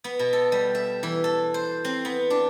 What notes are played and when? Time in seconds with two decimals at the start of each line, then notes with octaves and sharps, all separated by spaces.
0.04 B3
0.19 B2
0.33 A4
0.52 G3
0.75 E5
1.03 E3
1.24 A4
1.54 C5
1.84 C4
2.05 B3
2.30 D4